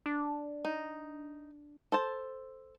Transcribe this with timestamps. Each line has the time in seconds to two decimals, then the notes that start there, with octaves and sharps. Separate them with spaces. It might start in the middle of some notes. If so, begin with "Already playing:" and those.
0.06 D4
0.65 D#4
1.92 A4 C5 A5